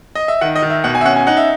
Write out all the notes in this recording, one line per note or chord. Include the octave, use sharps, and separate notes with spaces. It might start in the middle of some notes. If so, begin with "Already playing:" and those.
D#5
E5
D#3 F#5
D#5
D#3
E5
B2 F#5
G#5
E5
C#4 F#5
G#5
D#4 F#5
E5